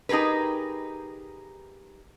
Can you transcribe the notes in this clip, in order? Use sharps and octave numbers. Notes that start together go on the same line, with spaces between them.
D#4 G4 G#4 A#4 B4